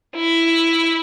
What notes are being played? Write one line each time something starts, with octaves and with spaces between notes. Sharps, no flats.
E4